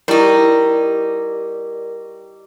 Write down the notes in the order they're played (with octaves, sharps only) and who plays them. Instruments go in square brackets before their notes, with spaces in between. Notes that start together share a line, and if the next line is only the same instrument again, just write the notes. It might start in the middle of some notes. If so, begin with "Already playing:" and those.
[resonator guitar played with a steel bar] G3 D#4 [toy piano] E4 G4 [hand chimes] A#4 D5 C#6